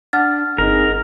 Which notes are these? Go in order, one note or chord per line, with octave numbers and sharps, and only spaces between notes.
D4 F#5 F6 A6
G1 C4 D#4 G#4 A#4